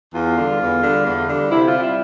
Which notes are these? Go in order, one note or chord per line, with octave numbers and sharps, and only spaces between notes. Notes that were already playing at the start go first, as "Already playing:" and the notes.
E2 F4
D3 G3
E2
D3 G3
E2
D3 G3
C3 E4
F4
G3 C4
E5